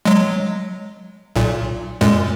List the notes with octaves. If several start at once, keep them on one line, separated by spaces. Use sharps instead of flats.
F#3 G#3
B1 A#2
F#2 A#2 G#3